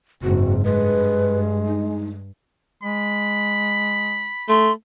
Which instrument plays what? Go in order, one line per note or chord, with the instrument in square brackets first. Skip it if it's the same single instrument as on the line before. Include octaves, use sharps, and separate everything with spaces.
[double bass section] F#1 G#2 [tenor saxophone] C4 [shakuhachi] F#4
[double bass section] G2 [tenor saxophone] G#3 [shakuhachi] B4
[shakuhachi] D#4
[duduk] G#3 [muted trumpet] B5
[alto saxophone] A3 [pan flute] C6